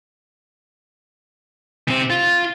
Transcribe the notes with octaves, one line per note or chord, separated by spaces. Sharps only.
C3 C4
F4